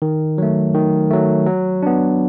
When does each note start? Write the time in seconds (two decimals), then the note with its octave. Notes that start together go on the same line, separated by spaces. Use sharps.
0.02 D#3
0.38 F#3 A3
0.74 D#3
1.10 F#3 A3
1.46 F#3
1.83 B3 D4